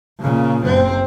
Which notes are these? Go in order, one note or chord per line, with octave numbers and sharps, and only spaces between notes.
A#2 C#3
F#1 C4